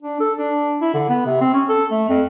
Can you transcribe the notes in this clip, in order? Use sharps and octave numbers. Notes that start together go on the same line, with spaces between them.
D4
A4
D4
E4
D3
B3
C3
C4
C#4
A4
A3
F2